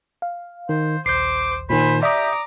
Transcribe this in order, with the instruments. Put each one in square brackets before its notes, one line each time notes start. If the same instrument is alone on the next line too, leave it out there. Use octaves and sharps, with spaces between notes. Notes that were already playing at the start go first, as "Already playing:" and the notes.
[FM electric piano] F5
[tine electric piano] D#3 [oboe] C5
[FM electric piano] A#1 D#2 [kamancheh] C5 [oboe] D6 [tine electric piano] G6 C7
[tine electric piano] A#2 D#3 [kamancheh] C5 G#5 [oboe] B5
[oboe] G4 [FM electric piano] D5 D#6 [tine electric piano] E5 [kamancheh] A#5 D6